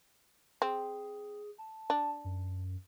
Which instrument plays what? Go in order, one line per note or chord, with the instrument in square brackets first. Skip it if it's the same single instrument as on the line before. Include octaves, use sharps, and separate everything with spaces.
[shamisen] C4 [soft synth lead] G#4
[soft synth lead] A5
[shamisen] D4
[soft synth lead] F#2